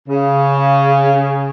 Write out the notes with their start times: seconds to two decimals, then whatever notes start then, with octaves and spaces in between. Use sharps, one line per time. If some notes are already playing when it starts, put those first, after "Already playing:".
0.08 C#3